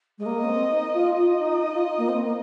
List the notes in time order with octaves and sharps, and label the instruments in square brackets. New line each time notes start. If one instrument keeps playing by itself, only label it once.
[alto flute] G#3
[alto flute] A#3 [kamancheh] D#5
[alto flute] C#4
C4
D#4
F4
[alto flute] F4 [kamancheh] D#5
[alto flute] D#4
D#4
F4
A#3
C4
A#3